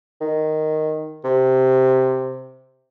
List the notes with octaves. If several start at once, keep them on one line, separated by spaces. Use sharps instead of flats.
D#3
C3